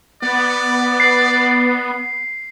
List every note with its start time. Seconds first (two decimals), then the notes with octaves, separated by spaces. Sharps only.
0.22 B3 D5
1.00 C7